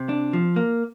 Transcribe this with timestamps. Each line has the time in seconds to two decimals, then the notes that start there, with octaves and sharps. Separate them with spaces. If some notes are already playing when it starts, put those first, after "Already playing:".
Already playing: C3
0.09 D4
0.33 F3
0.56 A#3